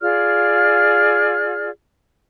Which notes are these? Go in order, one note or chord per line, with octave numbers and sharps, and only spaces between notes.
F4 G#4 D5 F6